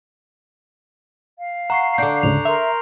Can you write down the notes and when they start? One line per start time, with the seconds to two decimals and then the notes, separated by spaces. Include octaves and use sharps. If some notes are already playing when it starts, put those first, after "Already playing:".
1.39 F5
1.70 F#5 A#5 C#6 C7
1.98 D3 D4 G6
2.23 D2 G#2 C#3 F7
2.45 A#4 E5 C6 F7